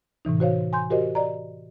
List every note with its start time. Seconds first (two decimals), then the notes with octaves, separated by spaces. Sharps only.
0.25 A2 C3 E3 D#4
0.40 F#4 C5 C#5 F5
0.73 G#5 C6 G6
0.90 F#4 G4 A#4 C5 D#5
1.15 D5 D#5 A#5